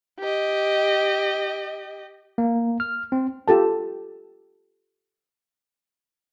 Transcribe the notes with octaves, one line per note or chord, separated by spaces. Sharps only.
G4 D#5
A#3
F6
C4
F4 G4 A4 A5